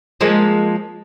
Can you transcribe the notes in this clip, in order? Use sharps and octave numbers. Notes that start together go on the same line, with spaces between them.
F3 G#3 A#3